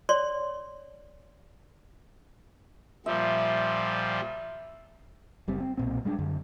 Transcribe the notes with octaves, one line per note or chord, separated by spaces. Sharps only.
C#5 D5 C6
A#2 F3 G3 E5
F#1 G3 C4
C4
B1 A#2 C4
G3 G#3 C#4 D4
F#2 D3